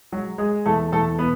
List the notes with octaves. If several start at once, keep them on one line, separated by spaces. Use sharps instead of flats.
F#3 G#3 F#4
G#3 G#4
E2 A3 A4
E2 A3 A4
B2 B3 B4